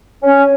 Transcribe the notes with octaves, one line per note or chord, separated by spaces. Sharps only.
C#4